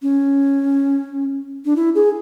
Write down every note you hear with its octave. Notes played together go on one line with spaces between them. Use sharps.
C#4
D4
E4
G#4